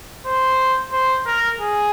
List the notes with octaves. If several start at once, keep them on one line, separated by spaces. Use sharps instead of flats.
C5
C5
A#4
G#4